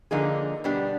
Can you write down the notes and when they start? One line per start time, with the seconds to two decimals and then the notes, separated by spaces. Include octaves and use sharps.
0.11 D3 F3 A#3 D#4 G#4
0.64 B2 G3 B3 D4 G4